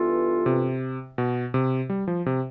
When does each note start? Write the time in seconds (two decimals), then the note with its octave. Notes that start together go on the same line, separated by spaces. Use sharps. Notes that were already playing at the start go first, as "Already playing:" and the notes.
Already playing: G2 E3 B3 F4 A4
0.46 C3
1.18 B2
1.54 C3
1.90 G3
2.08 F3
2.26 C3